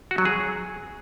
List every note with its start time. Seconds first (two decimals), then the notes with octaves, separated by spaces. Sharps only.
0.11 F#4
0.18 F#3
0.25 G#4